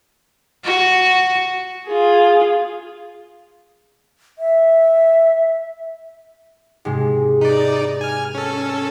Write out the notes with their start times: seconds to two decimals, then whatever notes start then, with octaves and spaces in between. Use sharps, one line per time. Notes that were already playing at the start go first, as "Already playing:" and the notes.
0.64 F#4
1.87 F4 G#4
4.39 E5
6.85 G#2 C3 G#3
7.41 D#4 B4 D5
8.01 G#5 F6
8.35 C#4 A4